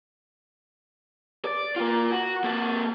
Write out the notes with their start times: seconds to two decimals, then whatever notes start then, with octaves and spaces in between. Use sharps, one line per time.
1.45 D5
1.76 A#3 F4
2.11 F#4
2.44 A#3 A4